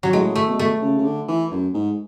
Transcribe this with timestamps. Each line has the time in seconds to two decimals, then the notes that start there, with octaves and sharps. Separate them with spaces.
0.03 F#3
0.13 A2 G#3
0.35 A3
0.47 B2
0.59 A3
0.82 C#3
0.98 C#3
1.05 D3
1.28 E3
1.51 F#2
1.74 G#2